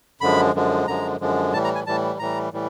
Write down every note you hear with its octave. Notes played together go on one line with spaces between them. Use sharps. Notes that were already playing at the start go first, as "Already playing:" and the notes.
F#2 D3 F3 G#3 B5
F#2 D3 F3 G#3
F#2 D3 F3 G#3 A#5
F#2 D3 F3 G#3
A2 E3 G3 A5
A#5
G#5
A2 E3 G3 A5
A2 E3 G3 A#5
A2 E3 G3